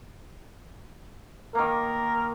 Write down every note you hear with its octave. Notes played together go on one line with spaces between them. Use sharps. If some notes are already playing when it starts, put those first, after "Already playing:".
D#3 A#3 A#4